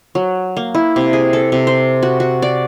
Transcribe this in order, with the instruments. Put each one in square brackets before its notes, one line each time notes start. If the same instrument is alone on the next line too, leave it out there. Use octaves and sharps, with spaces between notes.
[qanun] F#3
A#3
E4
C3
G#4
A4
C3
C5
F#4
F#4
D5